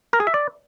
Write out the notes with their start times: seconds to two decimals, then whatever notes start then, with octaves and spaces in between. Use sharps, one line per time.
0.13 A#4
0.20 G#4
0.27 E5
0.34 D5